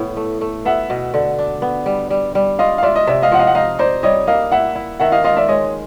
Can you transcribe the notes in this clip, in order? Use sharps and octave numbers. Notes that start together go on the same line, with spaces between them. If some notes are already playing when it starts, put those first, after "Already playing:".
Already playing: A2 B3
A3
A3
B3 E5 F#5
B2
D3
D4
B3
G3
G3
G3
F4 D#5 F5
F5
F4 D5 E5
D#5
C3 D5 E5
D#5 F5
F3 F#5
D#5 F5
F#5
D#4 D#5 F5
D#4 C5 D5
G3 C#5 D#5
A#3 D#5 F5
E4 E5 F#5
E4
D#3 E5 F#5
D#5 F5
F4 D#5 F5
D5 E5
G#3 C#5 D#5